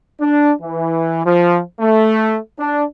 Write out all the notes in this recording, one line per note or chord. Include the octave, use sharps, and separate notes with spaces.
D4
E3
F3
A3
D4